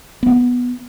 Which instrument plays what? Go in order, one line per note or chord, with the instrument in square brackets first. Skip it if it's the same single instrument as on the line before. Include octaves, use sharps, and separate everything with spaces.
[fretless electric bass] B3